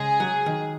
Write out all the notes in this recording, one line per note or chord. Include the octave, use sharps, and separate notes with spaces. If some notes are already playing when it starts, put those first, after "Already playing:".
Already playing: C#3 G#3 G#4
F#3
D#3